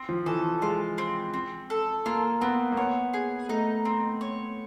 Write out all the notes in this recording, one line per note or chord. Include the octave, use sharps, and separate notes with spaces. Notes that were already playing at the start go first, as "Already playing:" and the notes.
Already playing: C4
F3
E3 A4
G#3 F4
C4
C4
A4
A#3 F4
B3 C4
A#3
B3 C#5
G#4
A3 D#4
C4
C#5